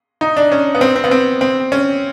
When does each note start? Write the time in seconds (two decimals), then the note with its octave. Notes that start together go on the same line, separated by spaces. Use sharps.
0.21 D#4
0.37 D4
0.52 C#4
0.75 B3
0.81 C4
0.96 C4
1.04 B3
1.11 C4
1.41 C4
1.72 C#4